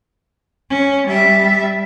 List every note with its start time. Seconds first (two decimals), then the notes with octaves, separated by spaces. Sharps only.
0.70 C#4
1.07 G3 E5